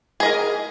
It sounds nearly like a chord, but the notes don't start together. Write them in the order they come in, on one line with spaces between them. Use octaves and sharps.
G#4 D#5 A#4